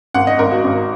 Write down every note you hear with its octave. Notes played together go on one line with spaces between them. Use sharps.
G#1 F#5
D#5
G#1 A#4
F#4
G#1